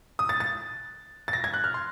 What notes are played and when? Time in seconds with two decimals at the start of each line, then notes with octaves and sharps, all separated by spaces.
0.19 D#6
0.29 A6
0.40 A6
1.28 A6
1.33 A#6
1.44 G#6
1.54 F#6
1.64 F6
1.74 C6